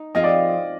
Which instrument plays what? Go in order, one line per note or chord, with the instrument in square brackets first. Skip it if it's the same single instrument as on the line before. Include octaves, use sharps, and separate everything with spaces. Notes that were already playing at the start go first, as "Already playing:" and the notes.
Already playing: [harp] D#4
[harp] F3 C4 F4 G#4 [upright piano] D#5
[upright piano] D5